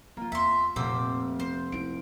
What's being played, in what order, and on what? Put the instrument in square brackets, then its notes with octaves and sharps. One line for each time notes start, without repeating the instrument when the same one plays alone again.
[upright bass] F3 [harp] A#3 F4
[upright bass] E2 [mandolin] E5 C6
[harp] F1 A3 [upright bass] A#2 [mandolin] C5 D6 E6
[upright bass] B3 [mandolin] C5
[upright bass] D#4 E4 [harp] D7